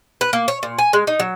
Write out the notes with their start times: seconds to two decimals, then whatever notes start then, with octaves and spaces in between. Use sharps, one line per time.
0.21 B4
0.33 A#3
0.48 C#5
0.63 A#2
0.79 G#5
0.93 G#3
1.07 D#4
1.20 F#3